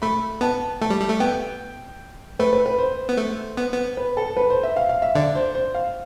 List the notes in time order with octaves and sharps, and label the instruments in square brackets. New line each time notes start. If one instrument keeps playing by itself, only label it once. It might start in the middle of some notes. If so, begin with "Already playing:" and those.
[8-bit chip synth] A3 [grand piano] B5
[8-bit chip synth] B3 [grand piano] A5
[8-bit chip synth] A3 [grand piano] A5
[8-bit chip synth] G3
G3
A3
[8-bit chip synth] B3 [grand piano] G5
[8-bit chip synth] A3 [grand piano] B4
[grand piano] B4
B4
C5
[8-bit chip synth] B3
A3
B3
B3
[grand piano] B4
A4
B4
C5
E5
F5
F5
E5
[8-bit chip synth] D3 [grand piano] D5
[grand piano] C5
C5
F5